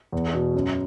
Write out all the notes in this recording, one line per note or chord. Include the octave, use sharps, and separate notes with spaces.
E2
B2
F#2